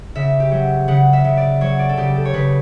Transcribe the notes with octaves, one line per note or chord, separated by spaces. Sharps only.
C#3 E5
G4
F#3
C#3 F#5
E5
C#3
D5
F#3 C#5
D5
A4
C#3 G4
A4
C#5
C#3 B4